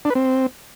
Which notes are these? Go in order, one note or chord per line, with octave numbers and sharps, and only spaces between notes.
D4
B4
C4